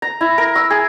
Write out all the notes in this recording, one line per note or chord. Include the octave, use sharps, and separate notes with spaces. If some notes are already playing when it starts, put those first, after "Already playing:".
A#5
E4
A#4
E6
G#4